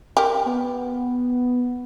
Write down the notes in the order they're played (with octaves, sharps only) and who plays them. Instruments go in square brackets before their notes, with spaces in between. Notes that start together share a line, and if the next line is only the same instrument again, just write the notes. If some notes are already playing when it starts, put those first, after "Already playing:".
[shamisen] G4 A#4
[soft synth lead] B3